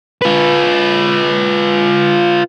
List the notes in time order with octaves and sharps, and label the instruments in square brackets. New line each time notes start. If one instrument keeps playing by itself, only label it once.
[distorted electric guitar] F4 B4